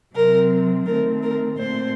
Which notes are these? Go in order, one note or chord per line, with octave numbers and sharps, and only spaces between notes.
C3 F#3 C4 A#4
D#3 A3 C4 A#4
A#4
A#2 A3 C4 C5